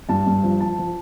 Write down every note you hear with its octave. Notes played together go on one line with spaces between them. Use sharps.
G2 A5
G2
F3
F3 A5
F3